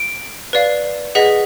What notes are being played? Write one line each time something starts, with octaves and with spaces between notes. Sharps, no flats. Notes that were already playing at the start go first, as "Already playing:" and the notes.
Already playing: D7
B4 D5 F5
G#4 B4 D#5 F#5 B6